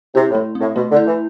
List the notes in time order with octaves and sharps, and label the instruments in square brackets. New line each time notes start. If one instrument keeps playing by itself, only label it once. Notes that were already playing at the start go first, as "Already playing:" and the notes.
[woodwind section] C3 [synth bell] E4
[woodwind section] A2
[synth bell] A3
C4
[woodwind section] A2
[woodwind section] B2 [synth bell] A3
[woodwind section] D3
[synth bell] E4
[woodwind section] E3